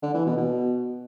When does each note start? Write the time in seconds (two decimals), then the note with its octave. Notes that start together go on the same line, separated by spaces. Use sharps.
0.02 D3
0.14 E3
0.26 B2
0.37 B2